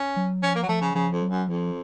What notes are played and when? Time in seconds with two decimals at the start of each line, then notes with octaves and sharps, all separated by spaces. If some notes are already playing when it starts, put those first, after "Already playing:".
Already playing: C#4
0.16 F#3
0.43 F3 C#4
0.56 A#3
0.63 F#3
0.68 F3 A3
0.82 C#3
0.95 C#3 F3
1.13 F2
1.22 F#3
1.30 F#2
1.48 F2 F3